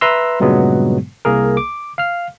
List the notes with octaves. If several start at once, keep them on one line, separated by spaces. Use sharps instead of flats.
B4 E5 A#5 C6 E6
G2 A#2 C#3 F#3 G#3 B3
C2 A#3 G#4 A#4
D6
F5 F6